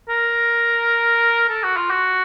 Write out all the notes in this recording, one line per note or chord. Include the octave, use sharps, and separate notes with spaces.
A#4
A4
F#4
F4
F#4